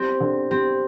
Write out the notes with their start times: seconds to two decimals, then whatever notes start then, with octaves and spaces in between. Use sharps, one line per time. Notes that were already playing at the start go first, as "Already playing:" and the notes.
Already playing: G3 C4
0.20 D3
0.51 G3 C4